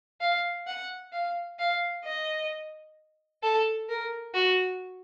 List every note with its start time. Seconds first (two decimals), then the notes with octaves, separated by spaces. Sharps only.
0.21 F5
0.67 F#5
1.12 F5
1.59 F5
2.04 D#5
3.43 A4
3.89 A#4
4.34 F#4